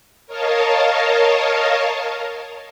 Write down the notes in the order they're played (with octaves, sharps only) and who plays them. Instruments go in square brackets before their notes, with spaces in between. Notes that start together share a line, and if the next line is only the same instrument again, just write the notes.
[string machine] A#4 C#5 D#5 F5 A5